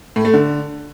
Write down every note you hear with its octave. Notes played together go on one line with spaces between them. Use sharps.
A2
A3
D3